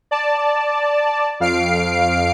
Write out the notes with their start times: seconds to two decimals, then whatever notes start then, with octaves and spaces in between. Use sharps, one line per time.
0.11 D5 A5
1.40 F2 F5 C7 D7